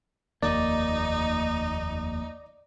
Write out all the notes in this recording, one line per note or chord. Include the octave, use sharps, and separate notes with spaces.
F1 D#2 A#3 D#4 D5